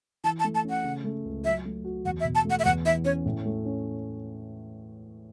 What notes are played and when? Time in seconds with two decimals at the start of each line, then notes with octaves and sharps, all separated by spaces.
0.24 E3 A5
0.40 A5
0.44 A3
0.55 A5
0.64 C#4
0.70 F#5
0.84 C#3
1.04 A3
1.25 C#2
1.44 F#3 E5
1.65 A3
1.85 F#4
2.05 E2 F#5
2.20 E5
2.25 B2
2.35 A5
2.45 A3
2.50 F#5
2.59 E5
2.65 E2 F#5
2.85 E3 E5
3.05 C#4 C#5
3.26 A2
3.45 A3
3.65 C#4